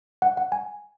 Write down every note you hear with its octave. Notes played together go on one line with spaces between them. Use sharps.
F#5
F#5
G#5